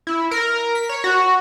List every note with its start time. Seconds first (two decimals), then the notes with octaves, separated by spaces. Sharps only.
0.07 E4
0.31 A#4
0.75 B6
0.89 C#5
1.04 F#4